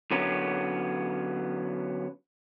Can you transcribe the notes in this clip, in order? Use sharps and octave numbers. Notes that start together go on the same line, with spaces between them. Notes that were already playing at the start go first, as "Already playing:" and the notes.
D3 F#3 B3 C#4